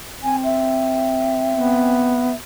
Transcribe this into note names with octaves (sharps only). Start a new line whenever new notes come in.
C4 G#5
E5
B3